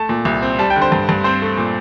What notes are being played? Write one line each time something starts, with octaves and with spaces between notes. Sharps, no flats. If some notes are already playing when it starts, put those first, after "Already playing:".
Already playing: A3 A5
A#2
C2
C4
G3 A5
G5
D3
C5
G2
G2
C4 C5
A3
A#2